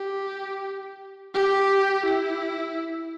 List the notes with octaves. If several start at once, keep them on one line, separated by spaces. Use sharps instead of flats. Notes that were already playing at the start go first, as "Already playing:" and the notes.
Already playing: G4
G4
E4